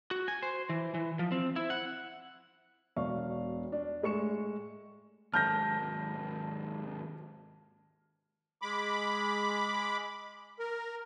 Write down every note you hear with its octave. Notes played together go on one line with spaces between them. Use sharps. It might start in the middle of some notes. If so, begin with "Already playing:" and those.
F#4
G#5
C5
E3
E3
F3
C4
E4
F#5
E1 B2 D4 F5 C#6
D4
A2 G#3 C#6 C#7 E7
D#2 G#2 A5 F6 G6 A#6
G#3 B5 D6
A#4